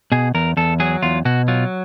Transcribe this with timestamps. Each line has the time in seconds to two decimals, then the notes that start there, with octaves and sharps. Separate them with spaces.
0.12 B2 G#4
0.34 E2 A#4
0.57 E2 A4
0.80 F#3 G#4
1.02 E2 F4
1.25 B2 F#4
1.48 F#3 F4